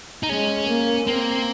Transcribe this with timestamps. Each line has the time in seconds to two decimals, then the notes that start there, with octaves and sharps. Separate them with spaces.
0.23 D#4
0.29 G#3 C#4
0.68 A#3
1.07 A#3 C4